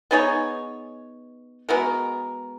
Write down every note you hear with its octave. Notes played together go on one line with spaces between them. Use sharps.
B3 D#4 G#4 C#5
G#3 B3 F#4 A#4